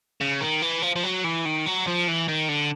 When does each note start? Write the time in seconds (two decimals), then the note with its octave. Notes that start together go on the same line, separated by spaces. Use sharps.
0.21 C#3
0.41 D#3
0.62 E3
0.82 F3
0.96 F3
1.03 F#3
1.24 E3
1.45 D#3
1.66 F#3
1.87 F3
2.07 E3
2.28 D#3
2.48 D3